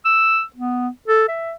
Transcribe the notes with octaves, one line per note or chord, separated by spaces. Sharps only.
E6
B3
A4
E5